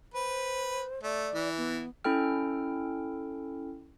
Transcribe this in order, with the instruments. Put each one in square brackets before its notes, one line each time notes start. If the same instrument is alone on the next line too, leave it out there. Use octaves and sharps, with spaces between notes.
[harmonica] B4 [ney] C5
[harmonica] A3 [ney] D5
[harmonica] E3
[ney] B3
[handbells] C#4 E4 A4 G5 F6